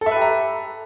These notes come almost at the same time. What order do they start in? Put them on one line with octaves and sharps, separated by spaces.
A4 E5 B4 G4 A#5